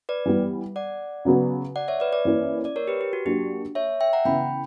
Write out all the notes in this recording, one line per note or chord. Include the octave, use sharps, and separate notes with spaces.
B4 D5
E3 G3 B3
D5 F#5
C#3 F#3 B3 F#4
D5 F#5
C#5 E5
B4 D5
B4 D5
E3 A#3 C#4 E4
D5
A#4 C#5
G4 B4
G4
F#4
F#3 A#3 D4 F#4 G4
C#5 E5
E5 G5
F#5 A#5
C#3 E3 B3 G5 B5